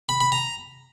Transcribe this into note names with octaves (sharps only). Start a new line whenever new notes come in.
B5
B5
A#5